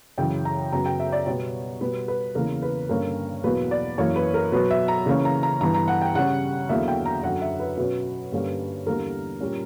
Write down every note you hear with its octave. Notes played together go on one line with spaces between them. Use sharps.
F#2 C#3 E3 G5
A#5
F#2 C#3 F#3 B3 A#5
G5
E5
D5
B2 G3 B3 C#5
B2 G3 B3 B4
B4
E2 C#3 E3 A#3 A#4
B4
G2 D3 A#3 C#4 A#4
E2 B2 F#3 A#3 B4
D5
F#2 E3 A#3 C#5
B4
A#4
B2 F#3 B3 B4
E5
A#5
C#3 E3 A#3 C#4
A#5
A#5
G2 E3 B3 A#5
A#5
F#5
G5
C#3 G3 C#4 F#5
E2 D3 F#3 A#3 E5
G5
A#5
F#2 D3 F#3 F#5
E5
B4
B2 F#3 C#4 B4
G2 D3 G3 A#3 C#4
E2 D3 G3 A#3 A#4
A#2 G3 C#4